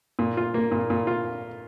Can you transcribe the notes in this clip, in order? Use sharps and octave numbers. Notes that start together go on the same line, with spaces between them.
A#2
F4
A#3
A#2
A#2
F4